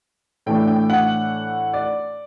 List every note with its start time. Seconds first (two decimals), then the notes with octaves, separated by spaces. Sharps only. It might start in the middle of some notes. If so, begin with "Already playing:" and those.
0.46 A2 E3 A3 D4 G5
0.67 G5
0.90 F#5
1.73 D5